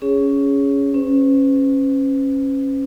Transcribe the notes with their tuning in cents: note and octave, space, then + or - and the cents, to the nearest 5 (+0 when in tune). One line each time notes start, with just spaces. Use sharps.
C#4 +10 G#4 -5 C#5 +0
C#4 -20 B4 +45